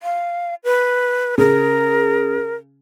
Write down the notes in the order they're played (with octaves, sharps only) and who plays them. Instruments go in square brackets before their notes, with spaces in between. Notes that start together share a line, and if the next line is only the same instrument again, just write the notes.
[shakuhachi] F5
B4
[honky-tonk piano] C#3 [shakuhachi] A#4